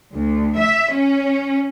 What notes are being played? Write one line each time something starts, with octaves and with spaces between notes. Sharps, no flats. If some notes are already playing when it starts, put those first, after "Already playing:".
D2
E5
C#4